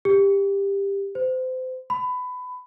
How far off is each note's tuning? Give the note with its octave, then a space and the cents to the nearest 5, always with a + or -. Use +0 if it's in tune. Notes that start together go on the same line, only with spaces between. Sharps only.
G4 +15
C5 -30
B5 +20